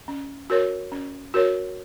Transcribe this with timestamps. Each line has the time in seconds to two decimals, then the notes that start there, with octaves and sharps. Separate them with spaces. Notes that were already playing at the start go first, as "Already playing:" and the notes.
0.08 C#4
0.50 F#4 A#4 C#5
0.92 C#4
1.34 F#4 A#4 C#5